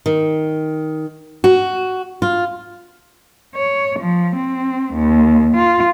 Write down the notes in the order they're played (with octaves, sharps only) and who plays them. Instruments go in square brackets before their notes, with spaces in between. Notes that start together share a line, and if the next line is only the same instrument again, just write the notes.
[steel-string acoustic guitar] D#3
F#4
F4
[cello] C#5
F3
C4
D#2
F4